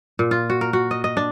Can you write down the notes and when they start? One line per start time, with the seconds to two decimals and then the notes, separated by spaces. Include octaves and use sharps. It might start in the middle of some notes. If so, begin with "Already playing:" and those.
0.19 A#2
0.31 F4
0.50 F#4
0.61 A#4
0.73 F#4
0.91 D#5
1.04 D#5
1.17 D4